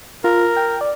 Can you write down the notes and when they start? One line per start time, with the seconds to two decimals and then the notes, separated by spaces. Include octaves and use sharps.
0.24 F4 A#4
0.57 G5
0.81 D5